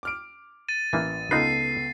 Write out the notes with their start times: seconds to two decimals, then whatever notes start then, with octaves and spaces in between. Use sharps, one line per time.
0.03 D6 F6 D7
0.69 A6 D#7
0.93 A1 E3 A#3
1.31 C#2 B3 D#4 F4 A4 B4 C7